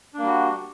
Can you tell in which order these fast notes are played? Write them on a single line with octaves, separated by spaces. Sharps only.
D4 A#3 G3 F#4